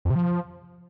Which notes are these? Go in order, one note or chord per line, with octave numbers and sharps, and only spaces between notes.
F2
C3
F3